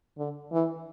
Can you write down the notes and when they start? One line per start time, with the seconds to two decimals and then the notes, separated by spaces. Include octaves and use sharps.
0.18 D3
0.52 E3